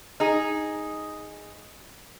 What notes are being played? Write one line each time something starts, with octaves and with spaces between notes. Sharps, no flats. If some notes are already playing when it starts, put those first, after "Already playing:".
D#4 G#4